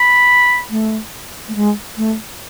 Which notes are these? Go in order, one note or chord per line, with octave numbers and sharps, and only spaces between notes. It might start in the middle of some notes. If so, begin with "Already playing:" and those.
Already playing: B5
A3
A3
G#3
A3